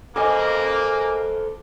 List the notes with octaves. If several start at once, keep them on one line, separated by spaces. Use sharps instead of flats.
A#3 A4 C5 D#5 G#5 D6